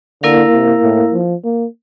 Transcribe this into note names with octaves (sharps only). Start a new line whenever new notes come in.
D3 A#3 E4 A#4 F5
C3
A2
F3
A#3